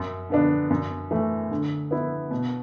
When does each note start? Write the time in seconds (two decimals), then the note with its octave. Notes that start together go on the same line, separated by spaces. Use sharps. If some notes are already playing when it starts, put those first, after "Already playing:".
Already playing: F#2
0.30 D3 B3 D4
0.70 F#2
1.11 E3 A3
1.51 D3
1.91 B3 E4
2.31 B2